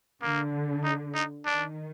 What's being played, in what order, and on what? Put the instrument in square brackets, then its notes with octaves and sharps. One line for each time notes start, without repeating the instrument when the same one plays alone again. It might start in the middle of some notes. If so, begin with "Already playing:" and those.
[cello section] D3 [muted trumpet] A#3
[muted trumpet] D#4
D#4
[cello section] D#3 [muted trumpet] D4